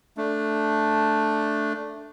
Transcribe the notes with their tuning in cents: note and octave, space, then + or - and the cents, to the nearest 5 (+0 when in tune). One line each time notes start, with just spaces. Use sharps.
A3 +0 D4 +0